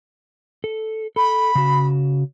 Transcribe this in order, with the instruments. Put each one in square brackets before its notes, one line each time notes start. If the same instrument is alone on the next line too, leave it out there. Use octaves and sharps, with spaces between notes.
[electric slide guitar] A4
[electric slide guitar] A4 [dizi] B5
[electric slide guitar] C#3 F#4